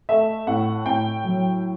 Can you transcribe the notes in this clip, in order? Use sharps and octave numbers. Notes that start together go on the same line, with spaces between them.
A3 E5
A2 F#5
A2 G5
F#3